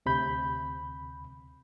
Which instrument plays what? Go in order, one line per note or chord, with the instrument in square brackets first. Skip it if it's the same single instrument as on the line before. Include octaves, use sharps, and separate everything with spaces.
[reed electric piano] D2 C3 B5 G6